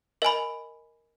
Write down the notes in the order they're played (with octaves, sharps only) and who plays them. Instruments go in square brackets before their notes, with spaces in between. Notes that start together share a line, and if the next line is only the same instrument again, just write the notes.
[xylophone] A#4 D#5 G#5 B5